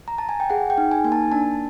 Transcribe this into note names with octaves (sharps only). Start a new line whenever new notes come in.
A#5
A5
G#5
G5
G#4 F#5
G5
D#4
G#5
A#3 G#5
A5
D4 A5